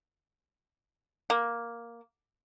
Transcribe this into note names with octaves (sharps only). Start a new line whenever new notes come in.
A#3